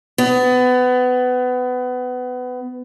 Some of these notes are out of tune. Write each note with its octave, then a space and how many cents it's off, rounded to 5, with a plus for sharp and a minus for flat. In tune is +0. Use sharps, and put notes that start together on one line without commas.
B3 +25